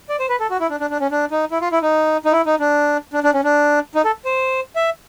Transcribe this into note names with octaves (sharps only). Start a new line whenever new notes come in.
D5
C5
B4
A4
F#4
E4
D4
D4
D4
C#4
D4
D#4
E4
F4
E4
D#4
D#4
E4
D#4
D4
D4
D4
C#4
D4
D#4
A4
C5
E5